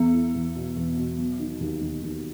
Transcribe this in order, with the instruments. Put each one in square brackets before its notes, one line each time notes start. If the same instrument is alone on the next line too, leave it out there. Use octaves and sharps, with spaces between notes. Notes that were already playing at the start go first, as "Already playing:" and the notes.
Already playing: [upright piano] E2 [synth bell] B3
[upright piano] E4
E2
B2
E2
B2
F#3
D#3
D#2
D#2
D#2